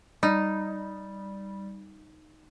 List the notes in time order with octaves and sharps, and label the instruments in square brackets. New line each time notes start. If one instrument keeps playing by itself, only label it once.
[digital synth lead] G3 [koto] D#4